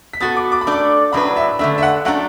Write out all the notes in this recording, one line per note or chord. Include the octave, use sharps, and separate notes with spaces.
B6
B3 F#4 A4 A6
D6
D6
B5
A3 D4 A4 D5 D6
A2 F#3 D4 B4 B5
E5
D3 A3 D4 E5
E5
F#5
F#3 A3 D4 A4 F#5